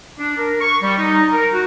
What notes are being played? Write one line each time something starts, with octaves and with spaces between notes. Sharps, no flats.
D4
A#4
C#6
G3
D#4
A#4
F#4